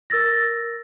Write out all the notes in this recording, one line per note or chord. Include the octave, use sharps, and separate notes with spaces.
A#4 E6 A6 A#6